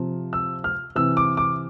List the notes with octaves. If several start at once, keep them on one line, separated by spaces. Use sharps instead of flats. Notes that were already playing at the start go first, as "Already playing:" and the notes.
Already playing: C3 F3
E6
F6
C3 E3 E6
D6
D6